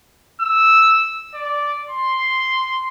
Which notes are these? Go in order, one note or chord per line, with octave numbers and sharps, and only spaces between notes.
E6
D5
C6